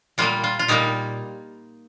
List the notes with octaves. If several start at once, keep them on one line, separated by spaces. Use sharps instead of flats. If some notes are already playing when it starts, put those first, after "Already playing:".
A#2 G3 A#3 F4
F4
F4
A#2 G3 A#3 D#4